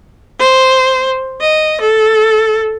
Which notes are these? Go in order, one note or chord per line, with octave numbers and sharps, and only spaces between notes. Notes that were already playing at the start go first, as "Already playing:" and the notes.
C5
D#5
A4